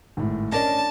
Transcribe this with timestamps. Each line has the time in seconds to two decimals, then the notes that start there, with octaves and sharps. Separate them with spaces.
0.17 G#1 A2
0.52 C#4 D4 A#4 D#5 A5 A#6